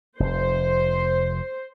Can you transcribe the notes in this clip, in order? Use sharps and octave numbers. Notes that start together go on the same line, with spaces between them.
F1 F2 C5